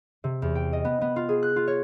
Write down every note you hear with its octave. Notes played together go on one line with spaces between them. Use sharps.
C3
E2
G5
D#5
B3
B3
F4
G#4
F#6
F4
C#5